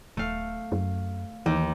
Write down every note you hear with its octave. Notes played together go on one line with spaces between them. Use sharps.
D#1 A3 F5
F#2
D#2 E3